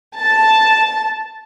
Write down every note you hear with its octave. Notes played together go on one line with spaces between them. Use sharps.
A5